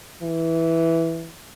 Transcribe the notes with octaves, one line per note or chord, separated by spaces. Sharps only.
E3